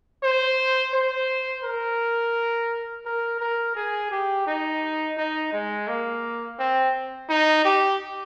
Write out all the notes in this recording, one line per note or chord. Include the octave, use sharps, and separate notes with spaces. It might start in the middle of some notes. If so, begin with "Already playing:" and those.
C5
C5
A#4
A#4
A#4
G#4
G4
D#4
D#4
G#3
A#3
C4
D#4
G4